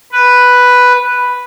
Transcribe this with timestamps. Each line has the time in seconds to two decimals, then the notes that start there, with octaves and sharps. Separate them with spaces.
0.12 B4